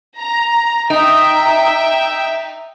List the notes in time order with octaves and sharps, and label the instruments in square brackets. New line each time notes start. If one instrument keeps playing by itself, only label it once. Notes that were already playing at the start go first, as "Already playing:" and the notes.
[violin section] A#5
[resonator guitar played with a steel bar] D#4 [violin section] E5 G5